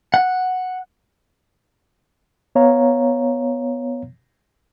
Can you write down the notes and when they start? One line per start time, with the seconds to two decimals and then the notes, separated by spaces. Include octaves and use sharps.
0.14 F#5
2.55 B3 C#5 F5 A#5